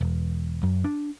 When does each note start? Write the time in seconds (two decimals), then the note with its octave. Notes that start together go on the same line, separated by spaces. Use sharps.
0.01 E1
0.63 F#2
0.84 D4